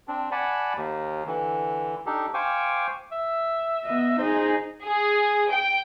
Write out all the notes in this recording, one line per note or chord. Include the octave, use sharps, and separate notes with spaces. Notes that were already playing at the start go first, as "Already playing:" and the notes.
C4 D4
D5 F#5 G#5 A5 B5
D#2
D3 E3
D4 D#4 G4 A4
C5 F5 G5 G#5 C#6 D6
E5
B3 D#5
D#4 G#4 C5
G#4
G5